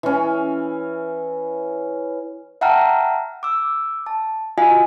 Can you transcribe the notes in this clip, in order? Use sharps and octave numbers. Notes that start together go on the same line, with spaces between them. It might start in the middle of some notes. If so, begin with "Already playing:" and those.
E3 C#4
E5 F#5 G5 A5 A#5 F6
D6 E6
A5
F4 F#4 D#5 F5 G#5